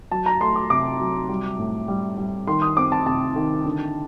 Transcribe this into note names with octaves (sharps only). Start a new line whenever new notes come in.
F#3 A5
A#5
A3 C6
D6
C3 D6
F#3
G3
A2
G3
G3
D#3 C6
D#6
C4 D6
A5
C3 A5
D#3
D3